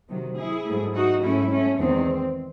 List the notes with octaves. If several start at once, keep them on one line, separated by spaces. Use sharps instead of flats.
C3 D#3 F#3
E4 G#4
G#2 F#3 A3
D#4 F#4
G#2 F#3 A3 C#4 E4
A3 C#4
E2 D#3 G#3 C4